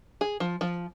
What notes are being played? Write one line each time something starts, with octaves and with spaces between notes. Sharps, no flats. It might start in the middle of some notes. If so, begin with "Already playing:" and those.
G#4
F3
F3